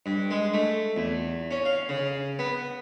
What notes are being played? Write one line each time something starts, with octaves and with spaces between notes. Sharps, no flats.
G2
G#3
A3
E2
C#4
F5
C#3
B3